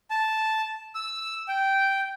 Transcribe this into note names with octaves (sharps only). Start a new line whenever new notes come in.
A5
E6
G5